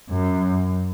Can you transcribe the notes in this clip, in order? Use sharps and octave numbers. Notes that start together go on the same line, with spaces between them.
F#2